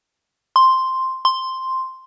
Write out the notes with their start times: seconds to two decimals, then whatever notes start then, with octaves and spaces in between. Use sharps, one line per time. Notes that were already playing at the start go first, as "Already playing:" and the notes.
0.56 C6
1.25 C6